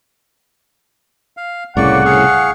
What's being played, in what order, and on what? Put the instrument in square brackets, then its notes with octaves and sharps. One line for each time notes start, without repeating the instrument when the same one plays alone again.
[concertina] F5
[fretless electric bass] C2 A2 C#3 [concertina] A#3 D5 C#6 [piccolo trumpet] F#5
[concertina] G#4 F5 C#6